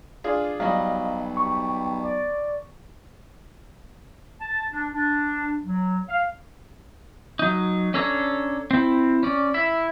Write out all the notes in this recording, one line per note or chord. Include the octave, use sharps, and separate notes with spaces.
D4 F4 G#4
B1 F#3 G3 D#5 F5
G4 C#6
D5
A5
D4
D4
F#3
F5
F#3 D#4
C#4 D4 A4 C#5 A#5
C4 E4
C#4 D5
E4 E5